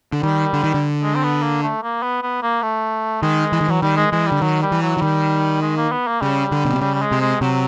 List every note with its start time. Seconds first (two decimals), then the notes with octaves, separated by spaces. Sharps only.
0.13 D3
0.23 D#3 G3
0.53 D3
0.64 D#3
0.74 D3
1.03 G#3
1.15 C4
1.24 B3
1.43 A#3
1.63 A3
1.83 A#3
2.03 B3
2.23 B3
2.43 A#3
2.63 A3
3.22 D#3 G#3
3.52 E3
3.61 D#3
3.69 E3 F#3
3.82 D#3 G3
3.97 G#3
4.12 E3 G#3
4.27 D3 G3
4.42 D#3 F#3
4.62 G3
4.72 E3
4.82 F#3
4.97 E3
5.02 D#3 G3
5.62 G#3
5.77 A#3
5.92 B3
6.07 A#3
6.21 C#3 G3
6.52 D3
6.65 B2
6.73 C3
6.81 C#3 G3
6.94 G3
7.02 G#3
7.12 C3
7.21 G#3
7.41 C3 F#3